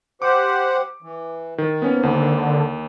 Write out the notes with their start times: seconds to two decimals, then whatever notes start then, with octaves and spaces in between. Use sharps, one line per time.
0.22 G4 C5 F#5 D6
1.02 E3
1.58 D#3
1.82 G#2 A#3 B3 C#4
2.03 D#2 D3